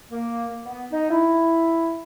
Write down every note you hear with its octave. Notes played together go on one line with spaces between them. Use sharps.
A#3
B3
D#4
E4